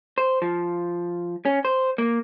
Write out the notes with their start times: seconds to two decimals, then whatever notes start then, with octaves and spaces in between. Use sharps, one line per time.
0.18 C5
0.42 F3
1.45 C#4
1.65 C5
1.98 A#3